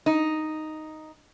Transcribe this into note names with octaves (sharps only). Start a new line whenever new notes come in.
D#4